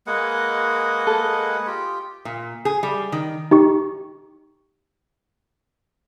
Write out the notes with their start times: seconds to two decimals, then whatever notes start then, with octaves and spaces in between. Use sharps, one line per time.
0.07 G#3 A#3 G#4 B4 D#5 F#5
1.07 A4
1.67 F4 G4
2.25 A#2
2.65 G#4
2.83 G3
3.12 D#3
3.51 D#4 G4 C#6